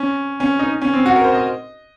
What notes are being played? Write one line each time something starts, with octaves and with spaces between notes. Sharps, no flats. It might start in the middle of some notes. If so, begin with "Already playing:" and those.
Already playing: C#4
C#4
D#4
C#4
C4
F#4
A#4
C5
D#5